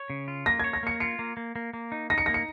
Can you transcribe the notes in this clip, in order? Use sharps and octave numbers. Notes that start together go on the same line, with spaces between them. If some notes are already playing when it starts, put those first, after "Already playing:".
Already playing: C#5
C#3
F4
A#3 A#6
C#5 G#6
A#6
A#3 C#7
F4 C#7
A#3
A#3
A#3
A#3
D#4
D#4 A#6
C#7
A#3 A#6
C#7